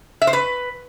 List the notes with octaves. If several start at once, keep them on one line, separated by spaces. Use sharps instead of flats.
E5
C5
B4